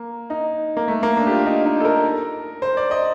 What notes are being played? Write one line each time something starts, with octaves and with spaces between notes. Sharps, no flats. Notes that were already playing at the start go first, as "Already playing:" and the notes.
Already playing: A#3
D#4
A#3
A3
A#3
D4
G4
F4
D#4
D#4
A4
A#4
C5
D5
D#5